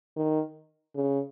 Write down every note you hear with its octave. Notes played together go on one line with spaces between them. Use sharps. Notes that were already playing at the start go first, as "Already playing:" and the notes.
D#3
C#3